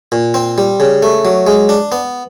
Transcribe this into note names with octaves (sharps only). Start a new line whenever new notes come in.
A#2
C4
G3
C#3
A3
F#3
G#3
D4
B3